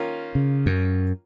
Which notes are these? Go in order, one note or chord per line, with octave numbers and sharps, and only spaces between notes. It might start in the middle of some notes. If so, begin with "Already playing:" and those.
Already playing: D#3 A#3 C#4 F4
C#3
F#2